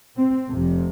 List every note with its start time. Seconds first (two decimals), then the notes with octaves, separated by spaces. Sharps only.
0.17 C4
0.50 F1 F2 C3